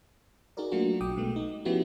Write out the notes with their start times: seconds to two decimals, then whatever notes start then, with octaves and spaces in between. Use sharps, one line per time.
0.57 D#4 F#4 G#4 A#4 D5
0.71 F#3 A3 A#3 D4 F4 F#4
1.01 B1 G5 D6 D#6
1.16 B2 G#3 A3 B3
1.36 D#4
1.65 F3 B3 C#4 E4 F#4 G4